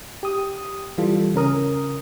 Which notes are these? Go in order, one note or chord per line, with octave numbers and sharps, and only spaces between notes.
G4 D#6
E3 G3 F4 A4
C#3 C#4 A#4 D#6